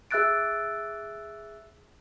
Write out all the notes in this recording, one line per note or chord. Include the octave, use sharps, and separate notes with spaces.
G#4 E5 E6 F#6 A6 D7